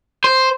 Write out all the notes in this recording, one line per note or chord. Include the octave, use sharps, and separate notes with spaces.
C5